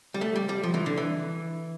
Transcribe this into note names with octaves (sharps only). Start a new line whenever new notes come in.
G3
A3
G3
G3
F3
E3
D3
E3